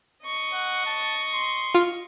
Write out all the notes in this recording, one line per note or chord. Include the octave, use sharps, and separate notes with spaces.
D#5 C#6
F#5
A5
C6
F4